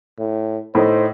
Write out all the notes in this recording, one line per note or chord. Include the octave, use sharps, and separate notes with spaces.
A2
A2 A3 D#4 C5